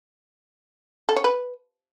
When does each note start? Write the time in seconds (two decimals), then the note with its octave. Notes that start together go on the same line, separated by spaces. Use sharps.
1.09 A4
1.16 C#5
1.24 B4